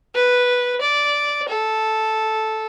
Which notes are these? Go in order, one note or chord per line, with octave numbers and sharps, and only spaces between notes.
B4
D5
A4